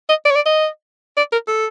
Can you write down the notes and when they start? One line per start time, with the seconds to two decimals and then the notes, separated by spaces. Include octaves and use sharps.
0.09 D#5
0.25 D5
0.30 C#5
0.35 D5
0.45 D#5
1.17 D5
1.32 A#4
1.48 A4